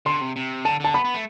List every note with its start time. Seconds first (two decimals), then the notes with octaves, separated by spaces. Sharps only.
0.06 D3 C6
0.21 C3
0.36 C3
0.65 D3 A5
0.80 D3 A5
0.94 B3 B5
1.05 B3
1.14 A3